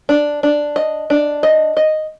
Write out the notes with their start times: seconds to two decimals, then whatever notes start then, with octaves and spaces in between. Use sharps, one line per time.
0.09 D4
0.43 D4
0.76 D#5
1.10 D4
1.43 D#5
1.77 D#5